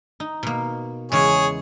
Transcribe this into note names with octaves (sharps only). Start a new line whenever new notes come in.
D#4
B2 A#3
E2 C#3 G#3 G#4 C#5